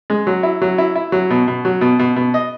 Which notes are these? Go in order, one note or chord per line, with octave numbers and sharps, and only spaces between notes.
G#3
F#3
E4
F#3
E4
E4
F#3
B2
B2
F#3
B2
B2
B2
D#5